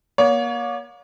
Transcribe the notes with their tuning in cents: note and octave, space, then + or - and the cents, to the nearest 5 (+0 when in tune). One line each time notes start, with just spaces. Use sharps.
A#3 +35 C#5 +35